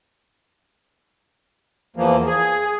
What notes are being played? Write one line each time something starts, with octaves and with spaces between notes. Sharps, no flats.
E2 E3 F3 A#3
G#4